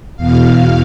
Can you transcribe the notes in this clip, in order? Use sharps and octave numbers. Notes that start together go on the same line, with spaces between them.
E2 B2 F5